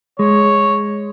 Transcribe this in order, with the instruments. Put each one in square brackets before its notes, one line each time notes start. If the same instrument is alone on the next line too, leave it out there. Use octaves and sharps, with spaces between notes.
[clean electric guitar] G#3 [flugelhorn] C#5